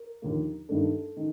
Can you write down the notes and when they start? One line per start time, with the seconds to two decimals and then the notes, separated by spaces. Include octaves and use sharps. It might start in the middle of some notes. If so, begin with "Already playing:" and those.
Already playing: A#4
0.22 D#2 D3 F3 A#3
0.69 G2 D#3 A#3 D4 A4
1.16 D#3